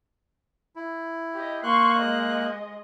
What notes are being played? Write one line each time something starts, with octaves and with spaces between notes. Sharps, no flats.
E4
G4 D#5
A#3 C6 C#6 F#6
G#3 D#5